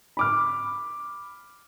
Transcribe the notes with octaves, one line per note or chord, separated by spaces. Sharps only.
B5 D6 F6